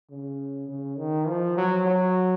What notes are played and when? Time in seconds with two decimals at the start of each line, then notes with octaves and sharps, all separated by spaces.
0.10 C#3
0.69 C#3
0.98 D#3
1.28 F3
1.57 F#3
1.86 F#3